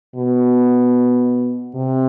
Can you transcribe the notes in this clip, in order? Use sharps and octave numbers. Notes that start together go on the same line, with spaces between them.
B2
C3